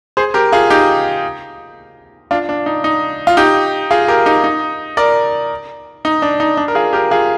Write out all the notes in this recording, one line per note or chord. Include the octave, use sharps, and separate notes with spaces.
G#4 C5
G4 A#4
F4 G#4
D#4 G4
D4 F4
D4
D#4
D#4
F4
D#4 G4
F4 G#4
G4 A#4
D#4 G4
D#4
A#4 D5
D#4
D4
D#4
D4
A#4
F4 G#4
G4 A#4
F4 G#4